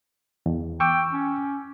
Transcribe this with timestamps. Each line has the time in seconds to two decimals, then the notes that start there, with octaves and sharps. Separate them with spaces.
0.46 E2
0.80 G5 C#6 D6 E6
1.12 C#4